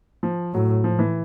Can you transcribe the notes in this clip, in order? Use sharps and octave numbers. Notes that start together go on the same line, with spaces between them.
F3
A2 F#3
F3
E3